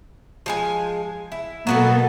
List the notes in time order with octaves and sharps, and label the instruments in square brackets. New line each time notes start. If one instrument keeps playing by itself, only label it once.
[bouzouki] F3 G#3 G#5
E4
[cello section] B2 A#3 A4 [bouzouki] F#3 B3 B4